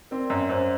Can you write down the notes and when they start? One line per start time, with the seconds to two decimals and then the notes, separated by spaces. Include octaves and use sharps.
0.11 C4 A#4 D5
0.30 F#2
0.50 F#2 C5
0.60 D5